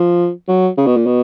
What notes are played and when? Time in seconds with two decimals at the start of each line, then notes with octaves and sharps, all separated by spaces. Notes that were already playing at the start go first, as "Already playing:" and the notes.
Already playing: F3
0.48 F#3
0.78 C#3
0.87 B2
0.97 A#2
1.06 B2